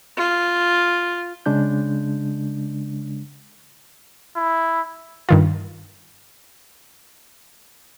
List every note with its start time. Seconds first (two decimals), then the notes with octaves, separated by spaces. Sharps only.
0.17 F4
1.46 C#3 G#3 D4 G6
4.36 E4
5.29 G2 D#3 F4